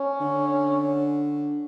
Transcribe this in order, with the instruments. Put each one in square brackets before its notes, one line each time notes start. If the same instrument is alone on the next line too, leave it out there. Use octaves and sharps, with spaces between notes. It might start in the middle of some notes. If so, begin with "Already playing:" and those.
Already playing: [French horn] C#4
[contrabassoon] D3